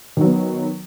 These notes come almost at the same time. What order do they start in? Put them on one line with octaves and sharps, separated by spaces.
D#3 F#3 B3